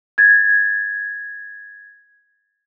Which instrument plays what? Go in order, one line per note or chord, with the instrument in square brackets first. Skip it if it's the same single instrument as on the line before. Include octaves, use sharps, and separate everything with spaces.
[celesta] G#6 A6